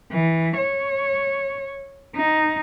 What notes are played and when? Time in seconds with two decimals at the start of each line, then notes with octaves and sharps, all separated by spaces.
0.12 E3
0.58 C#5
2.16 D#4